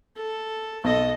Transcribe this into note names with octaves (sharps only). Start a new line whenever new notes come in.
A4
B1 A4 D#5